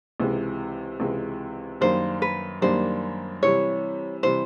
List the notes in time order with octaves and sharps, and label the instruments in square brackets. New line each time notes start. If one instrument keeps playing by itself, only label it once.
[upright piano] C#2 C3 E3 G#3
C#2 C3 E3 G#3
[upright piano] F#2 D#3 G3 A#3 D4 [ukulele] C5
[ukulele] B4
[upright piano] F#2 D#3 G3 A#3 D4 [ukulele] C5
[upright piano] C3 E3 G3 [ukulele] C#5
[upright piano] C3 E3 G3 [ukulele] C5